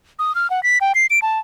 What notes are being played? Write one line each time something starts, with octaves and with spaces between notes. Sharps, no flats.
D#6
F6
F#5
B6
G5
C7
D7
A5